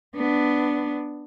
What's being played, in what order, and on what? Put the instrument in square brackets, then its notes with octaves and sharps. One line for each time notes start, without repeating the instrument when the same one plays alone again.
[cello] B3 D4